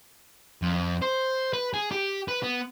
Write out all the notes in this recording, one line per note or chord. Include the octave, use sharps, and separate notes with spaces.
F2
C5
B4
G#4
G4
B4
B3